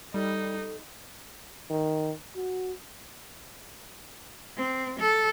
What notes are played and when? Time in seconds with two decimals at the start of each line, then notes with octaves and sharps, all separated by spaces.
0.14 G3 D#4 A4
1.70 D#3
2.36 F#4
4.57 C4
4.99 A4